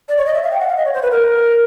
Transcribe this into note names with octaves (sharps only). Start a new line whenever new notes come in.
D5
C#5
D#5
E5
F5
G5
F#5
F5
D#5
C#5
C5
B4
A#4